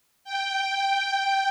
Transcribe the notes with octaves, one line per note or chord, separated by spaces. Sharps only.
G5